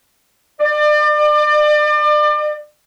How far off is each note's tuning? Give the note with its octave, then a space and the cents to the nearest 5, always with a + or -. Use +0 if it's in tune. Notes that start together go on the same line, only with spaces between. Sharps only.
D5 +35